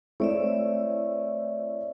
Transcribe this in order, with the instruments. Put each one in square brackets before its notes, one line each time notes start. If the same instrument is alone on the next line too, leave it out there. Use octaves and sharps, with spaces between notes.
[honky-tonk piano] A3 C4 E4 [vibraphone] C#5 D5 E5